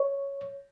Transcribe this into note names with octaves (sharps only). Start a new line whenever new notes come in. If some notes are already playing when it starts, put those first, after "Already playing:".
Already playing: C#5